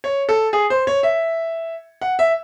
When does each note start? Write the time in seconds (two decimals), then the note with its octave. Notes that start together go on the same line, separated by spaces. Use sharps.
0.04 C#5
0.29 A4
0.53 G#4
0.70 C5
0.87 C#5
1.03 E5
2.01 F#5
2.19 E5